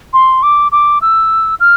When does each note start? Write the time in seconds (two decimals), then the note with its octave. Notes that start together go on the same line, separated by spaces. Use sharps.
0.13 C6
0.43 D6
0.72 D6
1.02 E6
1.60 F6